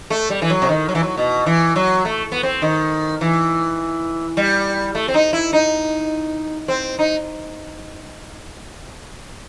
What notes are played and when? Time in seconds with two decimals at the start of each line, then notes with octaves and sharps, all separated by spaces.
0.10 A3
0.30 G3
0.42 E3
0.50 F#3
0.62 C3
0.69 D#3
0.89 F#3
0.95 E3
1.03 F#3
1.17 B2
1.46 E3
1.76 F#3
2.05 A3
2.32 B3
2.43 C4
2.62 D#3
3.21 E3
4.37 G3
4.95 A3
5.08 C4
5.14 D#4
5.33 E4
5.53 D#4
6.68 C4
6.99 D#4